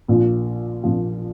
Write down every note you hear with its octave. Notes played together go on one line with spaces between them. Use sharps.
A#1 A#2 F3
A#1 A#2 F3